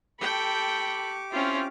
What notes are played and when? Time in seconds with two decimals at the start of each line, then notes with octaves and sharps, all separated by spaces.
0.21 G4 A4 G5 B5 C#6 D6
1.32 C4 C#4 E4 F4